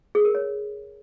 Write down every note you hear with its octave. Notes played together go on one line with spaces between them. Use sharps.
G#4
A#4
C#5